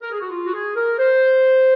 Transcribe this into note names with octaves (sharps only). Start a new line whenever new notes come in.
A#4
G#4
F#4
F4
F#4
G#4
A#4
C5